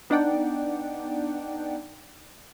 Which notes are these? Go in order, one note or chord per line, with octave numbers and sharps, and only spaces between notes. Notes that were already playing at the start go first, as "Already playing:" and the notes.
B3 D4 D#4 D5 F#5 G5